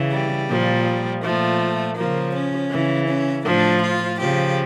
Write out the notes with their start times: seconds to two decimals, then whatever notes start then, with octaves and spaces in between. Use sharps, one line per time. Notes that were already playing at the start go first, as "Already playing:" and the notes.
Already playing: C#3 E3
0.12 G3
0.49 A#2 F3
1.23 A#2 F3 A3
1.97 C#3 F3 A#3
2.34 C#4
2.71 C#3 E3
3.08 C#4
3.44 A2 F3 D4
3.81 F4
4.19 C#3 F3 G4